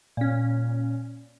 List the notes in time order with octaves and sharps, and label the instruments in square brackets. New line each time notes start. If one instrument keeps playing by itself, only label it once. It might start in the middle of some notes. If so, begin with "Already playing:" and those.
[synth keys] A#2 C#4